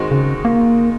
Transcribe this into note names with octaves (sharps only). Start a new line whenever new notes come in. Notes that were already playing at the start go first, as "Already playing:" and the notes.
Already playing: D#3 G#3 C4 D#4 F#4
C#3
A#3